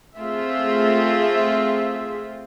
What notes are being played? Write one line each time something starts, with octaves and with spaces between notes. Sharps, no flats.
A3 C4 F4 G#4 E5